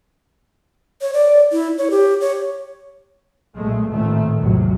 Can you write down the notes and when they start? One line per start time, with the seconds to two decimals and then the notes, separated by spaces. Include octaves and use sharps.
1.02 C#5
1.14 D5
1.52 E4
1.78 C#5
1.91 G4
2.21 C#5
3.56 B1 A#2 G#3 A3
3.89 A1 F2 A#2 D#3 A3
4.38 A#1 E2 A2 C3 F#3